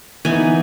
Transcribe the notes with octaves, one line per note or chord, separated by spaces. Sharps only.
E3 B3 D#4 G#5